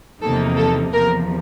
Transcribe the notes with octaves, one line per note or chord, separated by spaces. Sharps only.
E2 C3 F3 A#3 D#4 A4
A4
E2 C3 F3 A#4